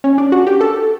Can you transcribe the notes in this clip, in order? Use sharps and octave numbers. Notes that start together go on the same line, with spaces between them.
C#4
D4
F#4
G4
A4